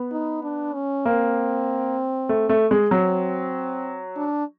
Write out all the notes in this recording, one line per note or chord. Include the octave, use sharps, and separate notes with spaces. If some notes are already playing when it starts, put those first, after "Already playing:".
Already playing: B3
D#4
D4
C#4
A#3 C4
A3
A3
G#3
F#3 C4
D4